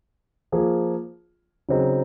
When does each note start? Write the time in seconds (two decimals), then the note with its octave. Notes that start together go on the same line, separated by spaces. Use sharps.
0.52 F3 A#3 F4 G#4
1.69 C#3 F#3 C4 D#4 G#4